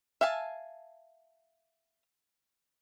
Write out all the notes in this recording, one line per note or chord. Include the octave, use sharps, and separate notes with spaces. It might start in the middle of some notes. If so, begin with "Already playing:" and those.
E5 F5 G#5 A5